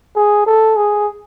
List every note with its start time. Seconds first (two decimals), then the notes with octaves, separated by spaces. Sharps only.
0.16 G#4
0.46 A4
0.76 G#4